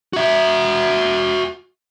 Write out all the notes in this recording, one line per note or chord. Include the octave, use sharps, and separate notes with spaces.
F#4 E5